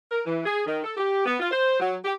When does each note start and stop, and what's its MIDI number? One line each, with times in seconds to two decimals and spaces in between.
0.12 0.21 70
0.26 0.45 52
0.46 0.64 68
0.66 0.82 51
0.84 0.95 69
0.97 1.24 67
1.26 1.37 59
1.40 1.50 65
1.51 1.79 72
1.80 1.96 54
2.05 2.13 67